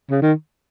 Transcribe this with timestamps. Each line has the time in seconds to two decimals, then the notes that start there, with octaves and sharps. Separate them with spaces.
0.11 C#3
0.22 D#3